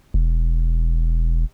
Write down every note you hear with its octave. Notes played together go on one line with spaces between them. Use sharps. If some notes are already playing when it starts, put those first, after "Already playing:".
E1